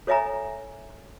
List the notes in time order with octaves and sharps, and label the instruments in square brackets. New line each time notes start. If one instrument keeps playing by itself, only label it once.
[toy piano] A4 C#5 D#5 E5 G#5 A#5